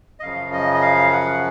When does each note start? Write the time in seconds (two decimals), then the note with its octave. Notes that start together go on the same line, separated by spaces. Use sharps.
0.20 D#5
0.23 F#2 C#3 F3 F5
0.52 D#5
0.74 D#5
0.82 F5
1.12 F#5